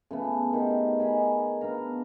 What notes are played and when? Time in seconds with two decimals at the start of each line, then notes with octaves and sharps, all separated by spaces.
0.11 C#3 A3 B3
0.53 D#3 G4
1.00 G#4 D#5 B5
1.61 B3 D4 F5 A#5